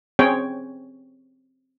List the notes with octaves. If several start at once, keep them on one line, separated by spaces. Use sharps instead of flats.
C4 C#4 G#4 C#5 G5